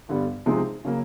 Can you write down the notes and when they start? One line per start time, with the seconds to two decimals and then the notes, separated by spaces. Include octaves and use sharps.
0.09 G2 D3 G3 B3
0.46 C3 F3 G#3 C4 D#4
0.85 C#3 F#3 A#3